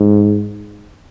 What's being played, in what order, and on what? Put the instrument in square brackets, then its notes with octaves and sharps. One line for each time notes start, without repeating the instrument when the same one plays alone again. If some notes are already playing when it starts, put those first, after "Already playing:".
Already playing: [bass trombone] G#2